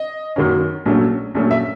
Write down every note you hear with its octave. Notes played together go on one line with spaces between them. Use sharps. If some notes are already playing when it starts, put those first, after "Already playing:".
Already playing: D#5
F#2 D#3 F#3 A#3 C#4
A#1 A#2 F#3 A3 C#4
A#1 A#2 F#3 A3 C#4
E5